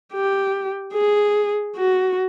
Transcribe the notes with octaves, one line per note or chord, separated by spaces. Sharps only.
G4
G#4
F#4